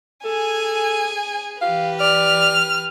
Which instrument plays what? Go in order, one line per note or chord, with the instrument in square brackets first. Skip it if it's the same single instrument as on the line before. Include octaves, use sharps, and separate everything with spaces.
[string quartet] G#4 [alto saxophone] A4 [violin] G#5
[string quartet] E3 G4 B4 [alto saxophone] F5
[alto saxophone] D5 [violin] F6